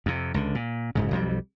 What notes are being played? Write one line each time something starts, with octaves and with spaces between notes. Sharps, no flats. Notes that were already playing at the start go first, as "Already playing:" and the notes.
F2 C3
C#2 D3
A#2
D1 G#2 C#3
B1 F2 F#3 G3